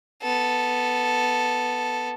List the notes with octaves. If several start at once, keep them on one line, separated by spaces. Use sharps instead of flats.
B3 A4